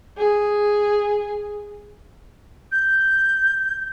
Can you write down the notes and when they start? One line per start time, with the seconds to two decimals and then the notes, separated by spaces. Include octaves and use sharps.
0.18 G#4
2.71 G6